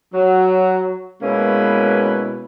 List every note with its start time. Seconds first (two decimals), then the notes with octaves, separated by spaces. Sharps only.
0.14 F#3
1.22 B2 G#3 A#3 C#4 E4 B4